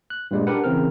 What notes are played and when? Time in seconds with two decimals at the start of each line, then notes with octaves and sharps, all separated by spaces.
0.10 F#6
0.31 G2 A#2 G3 G#3
0.47 D4 G4 A#4 B4 F#5
0.64 C#3 E3 C4 A#4 F6